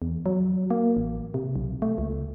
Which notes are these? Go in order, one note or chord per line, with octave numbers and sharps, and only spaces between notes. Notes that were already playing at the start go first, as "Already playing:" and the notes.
E2
F#3
A#3
A1
C3
B1
A3
C#2